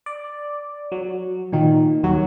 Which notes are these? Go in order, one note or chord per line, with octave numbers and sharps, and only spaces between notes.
D5
F#3
A#2 D#3
D#2 F#3